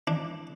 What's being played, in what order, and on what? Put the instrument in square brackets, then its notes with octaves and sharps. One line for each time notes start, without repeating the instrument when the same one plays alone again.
[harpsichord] D4